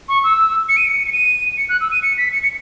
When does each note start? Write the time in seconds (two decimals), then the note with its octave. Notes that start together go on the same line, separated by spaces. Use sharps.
0.09 C#6
0.24 E6
0.69 C#7
0.77 D#7
0.87 C#7
1.07 C#7
1.12 D#7
1.57 C#7
1.69 F#6
1.81 E6
1.92 D#7
2.03 C#7
2.18 B6
2.32 C#7
2.43 C#7